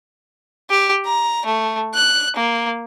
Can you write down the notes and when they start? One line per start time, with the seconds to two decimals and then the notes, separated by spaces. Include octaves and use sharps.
0.70 G4
1.05 A#5
1.46 A3
1.94 F#6
2.36 A#3